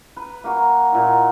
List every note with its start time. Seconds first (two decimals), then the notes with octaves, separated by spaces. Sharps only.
0.16 B4
0.44 A#3 F#4
0.92 A#2 E4